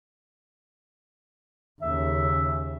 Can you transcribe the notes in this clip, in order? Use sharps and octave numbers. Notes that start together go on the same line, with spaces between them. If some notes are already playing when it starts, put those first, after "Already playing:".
D#2 C#3 E5